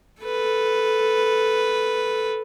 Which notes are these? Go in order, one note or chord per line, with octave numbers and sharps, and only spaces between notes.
A4 B4